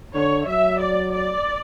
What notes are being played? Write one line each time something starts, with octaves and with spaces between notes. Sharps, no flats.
D3 C#5
F#3 E5
D5
D5